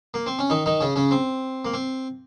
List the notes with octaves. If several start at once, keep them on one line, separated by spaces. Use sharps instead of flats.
A#3
C4
C#4
D#3 D#4
D#3 D#4
C#3 C#4
C#3 C#4
C4
A#3
C4